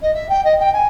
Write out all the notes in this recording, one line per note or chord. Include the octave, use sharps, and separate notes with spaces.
D#5
E5
G5
D#5
G5
G#5